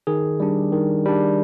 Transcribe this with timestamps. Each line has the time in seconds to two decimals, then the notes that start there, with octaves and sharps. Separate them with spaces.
0.07 D#3 G#4
0.40 G3 D4
0.73 D#3
1.05 G3 D4